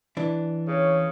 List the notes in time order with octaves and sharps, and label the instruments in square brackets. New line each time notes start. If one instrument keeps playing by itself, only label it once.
[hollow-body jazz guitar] E3 D4
[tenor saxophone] C#3 [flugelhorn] C#5